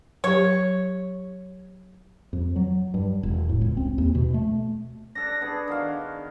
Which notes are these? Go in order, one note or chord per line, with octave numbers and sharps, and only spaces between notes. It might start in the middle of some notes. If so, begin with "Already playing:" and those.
F#3 G4 C#5
F2
F#3
G2
E1
A2
C#2
C4
D#2
B2
A3
D4 A4 D5 A#6
B3 D4 G#4
D#3 F#4 F5